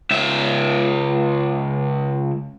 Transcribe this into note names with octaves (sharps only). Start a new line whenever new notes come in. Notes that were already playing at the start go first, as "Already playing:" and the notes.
C#2 E5